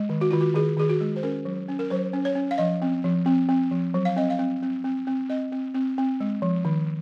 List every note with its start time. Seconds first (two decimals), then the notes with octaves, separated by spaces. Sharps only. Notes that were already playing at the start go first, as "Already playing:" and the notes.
Already playing: G#3
0.09 D#3
0.21 F#4
0.31 D#3 F4
0.41 F#4
0.54 D#3 G#4
0.77 D#3 G#4
0.90 F#4
1.00 G#3
1.16 C5
1.23 C#4 A#4
1.45 F#3
1.68 C#4
1.79 A#4
1.90 F#3 C5
2.13 C#4
2.25 C#5
2.35 C#4
2.51 F5
2.58 F3 D#5
2.82 C4
3.04 F3
3.26 C4
3.49 C4
3.71 F3
3.94 F#3
4.05 F5
4.16 C4 D#5
4.30 F5
4.39 C4
4.62 C4
4.84 C4
5.07 C4
5.29 C4 D#5
5.52 C4
5.74 C4
5.98 C4
6.20 G#3
6.42 F3
6.65 D#3